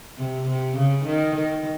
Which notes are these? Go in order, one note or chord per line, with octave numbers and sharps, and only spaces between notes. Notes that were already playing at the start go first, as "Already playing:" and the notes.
C3
C3
C#3
D#3
D#3